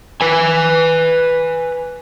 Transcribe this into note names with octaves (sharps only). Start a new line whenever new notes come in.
B4 G#5